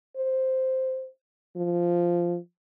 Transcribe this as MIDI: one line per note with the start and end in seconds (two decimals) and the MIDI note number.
0.17 1.07 72
1.56 2.37 53